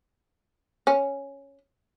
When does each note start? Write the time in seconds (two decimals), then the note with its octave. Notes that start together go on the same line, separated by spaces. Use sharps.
0.87 C#4